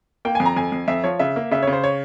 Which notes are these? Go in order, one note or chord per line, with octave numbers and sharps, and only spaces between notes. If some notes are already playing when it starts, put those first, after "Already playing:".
A#3 G5
F2 G#5
A#5
F2 G#5
F2
F2 E5
F3 C#5
C#3 E5
A#3
C#3 E5
C#3 C#5
C5
C#5